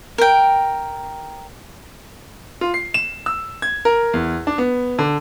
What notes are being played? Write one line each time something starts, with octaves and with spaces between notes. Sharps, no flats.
A#4 G5
F4
C7
E7
E6
G#6
A#4
E2
D4
B3
D3